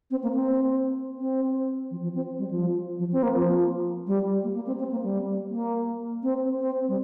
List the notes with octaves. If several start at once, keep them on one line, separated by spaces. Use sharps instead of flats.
C4
A#3
C4
C4
F3
F3
C4
G3
F3
F3
C4
A#3
F3
G3
A#3
A#3
C4
C4
A#3
G3
A#3
C4
C4
G3